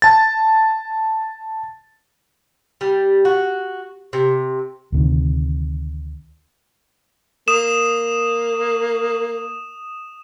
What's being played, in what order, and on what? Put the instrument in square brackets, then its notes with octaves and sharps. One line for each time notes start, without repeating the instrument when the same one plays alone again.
[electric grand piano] A5 A6
[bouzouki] G3
F#4
C3
[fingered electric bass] D2 C3 D#3
[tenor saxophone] A#3 [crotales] D#6 E7